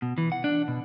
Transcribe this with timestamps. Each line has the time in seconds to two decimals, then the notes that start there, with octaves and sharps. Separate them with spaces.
0.02 B2
0.18 E3
0.32 F#5
0.44 D4
0.68 B2